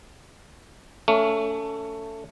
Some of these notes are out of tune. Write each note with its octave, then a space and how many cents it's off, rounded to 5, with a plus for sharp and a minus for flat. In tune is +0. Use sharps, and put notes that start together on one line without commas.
A3 +15 C#4 +30